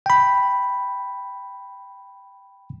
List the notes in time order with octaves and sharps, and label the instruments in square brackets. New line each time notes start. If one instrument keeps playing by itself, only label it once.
[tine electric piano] G5 B5